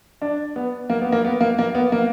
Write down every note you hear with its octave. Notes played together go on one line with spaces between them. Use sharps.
D4
B3
A#3
B3
A#3
B3
A#3
A#3
B3
A#3